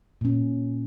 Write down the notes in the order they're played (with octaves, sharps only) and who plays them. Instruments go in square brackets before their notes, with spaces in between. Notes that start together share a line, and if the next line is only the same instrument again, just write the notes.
[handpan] A#2 C#4